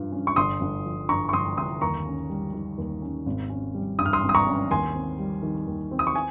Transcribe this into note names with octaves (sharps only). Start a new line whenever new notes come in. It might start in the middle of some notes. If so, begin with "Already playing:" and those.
Already playing: G2 F3
C#4
C#6
G1 C6 D#6
G1
F3
G2 A#5 C#6
C#6
G1 C6 D#6
G1 C6 D#6
D#2 A#5 C#6
C#4
G3
D#3
D#2
C#4
G#1
C#4
G3
G2 D#6
F6
C6 D#6
G#1
D#6
A#5 C#6
C#4
D#2 G#5 C6
C4
G3
D#3
D#2
C4
D#6
C#6
G#5